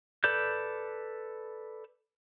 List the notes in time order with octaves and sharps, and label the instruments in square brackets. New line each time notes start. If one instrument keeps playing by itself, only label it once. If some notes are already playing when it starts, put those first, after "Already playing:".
[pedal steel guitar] A4 B4 D5 G6